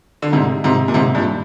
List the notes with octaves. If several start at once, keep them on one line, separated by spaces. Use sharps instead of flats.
D3
G#2 C3
G#2 C3
A#2
G#2 C3
G2 A#2